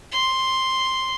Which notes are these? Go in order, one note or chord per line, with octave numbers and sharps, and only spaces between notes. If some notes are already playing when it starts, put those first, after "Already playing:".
C6